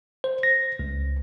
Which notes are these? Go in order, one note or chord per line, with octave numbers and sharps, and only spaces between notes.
C5
A#6
C#2